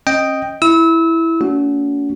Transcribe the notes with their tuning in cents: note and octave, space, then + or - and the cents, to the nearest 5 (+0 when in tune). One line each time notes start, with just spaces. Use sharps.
C#4 -40 D#5 +0 G5 +0
E4 +0 E6 -30
A#3 -45 C#4 +45 F#4 +0